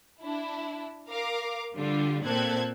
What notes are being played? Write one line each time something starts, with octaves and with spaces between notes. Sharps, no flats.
D4 E4
A#4 F5 D6
D3 G3 D4 F4
A#2 C4 A4 F#6 G#6